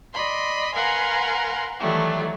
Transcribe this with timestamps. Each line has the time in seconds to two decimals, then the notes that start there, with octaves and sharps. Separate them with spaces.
0.13 D5 D#5 B5 C6
0.75 A#4 B4 F5 F#5 G#5 C6
1.80 D#3 E3 F#3 G3 A3